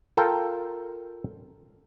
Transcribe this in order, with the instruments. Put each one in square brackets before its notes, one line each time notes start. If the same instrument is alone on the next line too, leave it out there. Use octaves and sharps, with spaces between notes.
[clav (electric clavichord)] F4 A4 A#4 G5